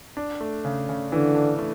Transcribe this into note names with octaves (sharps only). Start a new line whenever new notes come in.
D4
A3
C#3
C#3
D3 E3
D4
A3